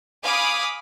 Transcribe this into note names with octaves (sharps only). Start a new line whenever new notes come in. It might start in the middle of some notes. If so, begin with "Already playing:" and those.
F5 G#5 B5 D6 D#6